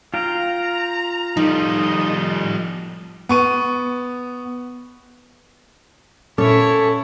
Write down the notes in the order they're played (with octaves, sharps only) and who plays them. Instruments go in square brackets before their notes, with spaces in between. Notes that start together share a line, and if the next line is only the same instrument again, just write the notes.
[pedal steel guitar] F4 F5 G5 [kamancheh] A#5
[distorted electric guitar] F3 G3 [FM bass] D#4 [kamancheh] A4 D#5
[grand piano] B3 C#6 D#7
[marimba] A#2 [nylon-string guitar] C#4 [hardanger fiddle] E4 C#5 [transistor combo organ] A4